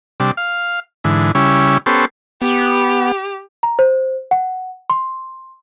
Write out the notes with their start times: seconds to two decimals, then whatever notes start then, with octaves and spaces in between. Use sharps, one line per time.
0.20 C3 G3 D4
0.37 F5
1.04 G#2 D3 E3
1.35 C#3 G3 C#4 E4
1.86 B3 C#4 G4 A4 C5
2.42 B3 G4
3.63 A#5
3.79 C5
4.31 F#5
4.90 C6